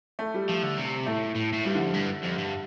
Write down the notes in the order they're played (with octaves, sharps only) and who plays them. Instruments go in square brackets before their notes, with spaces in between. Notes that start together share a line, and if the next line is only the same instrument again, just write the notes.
[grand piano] A3
G3
[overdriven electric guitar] F3 [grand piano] A3
[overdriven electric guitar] D3
C3
[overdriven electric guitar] A2 [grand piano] A3
[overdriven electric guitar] A2
A2
[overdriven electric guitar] G2 [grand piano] G3
[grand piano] D3
[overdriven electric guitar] F2
G2
F2
G2